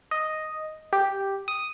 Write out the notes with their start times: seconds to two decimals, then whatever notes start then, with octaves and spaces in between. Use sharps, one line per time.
0.11 D#5
0.93 G4
1.48 D#6